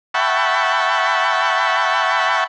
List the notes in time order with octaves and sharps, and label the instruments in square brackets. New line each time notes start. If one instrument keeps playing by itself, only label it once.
[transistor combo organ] E5 F#5 G5 A5 B5 C#6